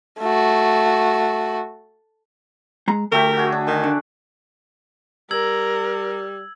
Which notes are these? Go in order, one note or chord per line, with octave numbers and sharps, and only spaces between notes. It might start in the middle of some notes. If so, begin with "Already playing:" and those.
A3 F#4
G#3 A#5
D2 A3 G4 A#4 E5
F#4 G#4
D4
D#3
D3
G3 A#4 E6 G#6 F#7